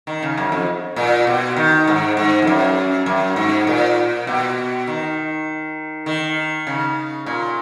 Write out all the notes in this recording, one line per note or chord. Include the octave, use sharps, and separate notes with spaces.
D#3
C#3
F#2
F2
A#2
B2
D#3
G#2
G#2
F2
F#2
F#2
G#2
A#2
B2
D#3
D#3
C#3
A#2